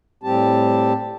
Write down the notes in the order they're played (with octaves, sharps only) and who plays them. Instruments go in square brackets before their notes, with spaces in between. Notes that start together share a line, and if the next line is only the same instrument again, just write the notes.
[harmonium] A2 G3 C4 G4 A5